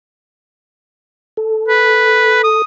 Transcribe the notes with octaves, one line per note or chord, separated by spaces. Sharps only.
A4
B4
D#6